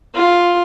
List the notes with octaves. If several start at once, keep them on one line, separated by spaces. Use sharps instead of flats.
F4